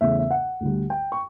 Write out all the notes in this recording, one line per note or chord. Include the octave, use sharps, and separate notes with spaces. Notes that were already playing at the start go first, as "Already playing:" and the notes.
E2 C#3 E3 A3 E5
E5
F#5
D2 D3 G3
G5
C#6